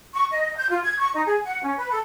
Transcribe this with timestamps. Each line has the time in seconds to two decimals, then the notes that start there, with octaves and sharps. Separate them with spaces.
0.13 C#6
0.31 D#5
0.56 G6
0.71 F4
0.83 G#6
0.98 C#6
1.14 D#4
1.26 G#4
1.44 F#5
1.63 C#4
1.77 B4
1.90 A4